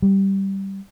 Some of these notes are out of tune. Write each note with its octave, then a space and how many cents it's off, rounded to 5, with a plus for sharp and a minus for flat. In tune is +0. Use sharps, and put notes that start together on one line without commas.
G3 -10